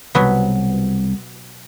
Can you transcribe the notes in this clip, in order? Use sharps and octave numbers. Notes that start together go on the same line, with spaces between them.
C2 B2 F#3 B3